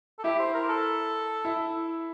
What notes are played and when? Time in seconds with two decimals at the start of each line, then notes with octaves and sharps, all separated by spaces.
0.19 A4
0.24 E4 G4 E5
0.39 C5
0.54 A#4
0.69 A4
1.45 E4 E5